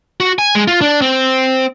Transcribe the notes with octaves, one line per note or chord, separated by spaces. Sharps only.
F#4
G#5
G#3
F4
D4
C4